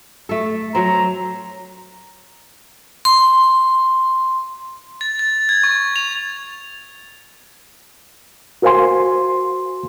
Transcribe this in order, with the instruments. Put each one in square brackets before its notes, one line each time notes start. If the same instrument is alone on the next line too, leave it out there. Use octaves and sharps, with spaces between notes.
[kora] A3 A4
[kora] F#3 C4 [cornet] A#5
[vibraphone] C6
[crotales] A6
A6
G#6
C#6
F7
[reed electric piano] F#4 A#4 C5 F5 G#5 C6